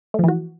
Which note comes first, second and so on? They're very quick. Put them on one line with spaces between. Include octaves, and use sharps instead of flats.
A3 F3 E3 F#4